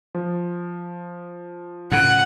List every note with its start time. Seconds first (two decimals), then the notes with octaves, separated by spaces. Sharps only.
0.15 F3
1.92 A2 C#3 F#5